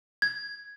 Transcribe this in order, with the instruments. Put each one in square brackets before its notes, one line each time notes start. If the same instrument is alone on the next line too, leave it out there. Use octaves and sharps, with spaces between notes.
[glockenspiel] G#6